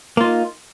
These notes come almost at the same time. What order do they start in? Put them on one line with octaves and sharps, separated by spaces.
A#3 F4 D#4